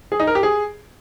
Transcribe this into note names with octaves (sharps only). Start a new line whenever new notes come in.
G#4
D#4
A#4
G4
G#4